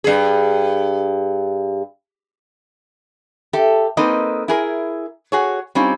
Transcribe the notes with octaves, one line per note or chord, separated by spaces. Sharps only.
G2 G#4
G4 A4 E5
A#3 C4 D#4 A4 B4 D#5
E4 G#4 A#4
F#4 G#4 C#5
G3 C4 C#4 D#4 F4